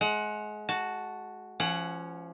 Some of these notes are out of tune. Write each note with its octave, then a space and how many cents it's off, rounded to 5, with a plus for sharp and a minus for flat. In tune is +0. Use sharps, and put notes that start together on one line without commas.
G#3 +30 F#5 +0
F#4 +0 A5 +0
F3 -30 C#4 +0 F#5 +10